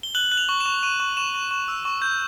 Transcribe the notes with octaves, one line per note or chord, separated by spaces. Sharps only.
G7
F#6 F#7
F#6
F7
C#6
E7
C#6
C#6 D#7
C#6
C#6 E7
C#6
C#6
E6
C#6
G6